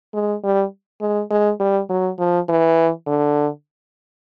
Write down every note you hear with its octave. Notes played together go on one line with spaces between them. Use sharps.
G#3
G3
G#3
G#3
G3
F#3
F3
E3
D3